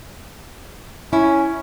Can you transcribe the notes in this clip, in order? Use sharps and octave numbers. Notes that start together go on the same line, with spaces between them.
C#4 E4